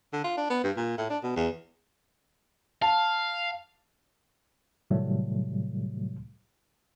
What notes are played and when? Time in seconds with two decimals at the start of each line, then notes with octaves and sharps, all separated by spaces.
0.13 D3
0.24 F4
0.37 D4
0.50 B3
0.64 G2
0.77 A#2
0.98 A2
1.10 D4
1.23 B2
1.36 E2
2.82 F5 A5
4.90 A2 C3 D#3 F#3 G3 A3